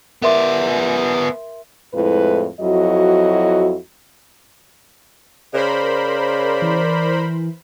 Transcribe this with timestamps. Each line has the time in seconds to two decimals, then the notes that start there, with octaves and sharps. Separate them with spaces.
0.22 B3 A#4 D5 E5 C6
1.94 F2 A2 G#3 E4 B4
2.61 F2 F#3 E4 F#4 D#5
5.54 C#3 A#4 C5 D5 B5
6.62 E3